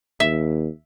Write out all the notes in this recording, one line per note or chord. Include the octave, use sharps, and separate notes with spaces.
D#2 E5